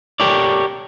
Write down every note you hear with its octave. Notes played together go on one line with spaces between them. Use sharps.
G4 A4 A#4 C#5 D5